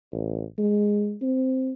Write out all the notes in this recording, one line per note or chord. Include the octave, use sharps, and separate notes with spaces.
A1
G#3
C4